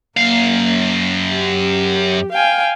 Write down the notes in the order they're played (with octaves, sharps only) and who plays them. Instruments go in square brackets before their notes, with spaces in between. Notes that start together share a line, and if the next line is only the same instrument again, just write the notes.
[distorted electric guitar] F#2 F5 [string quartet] A#3
[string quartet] G4
F5 G5 G#5